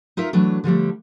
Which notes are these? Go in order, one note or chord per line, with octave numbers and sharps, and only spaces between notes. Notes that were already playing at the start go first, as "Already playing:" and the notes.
D#4 F4 A#4 E5
E3 F#3 A3 D4
D3 F3 G3 A3